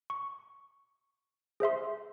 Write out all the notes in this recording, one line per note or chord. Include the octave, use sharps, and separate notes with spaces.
C#6
G#4 C5 E5 C6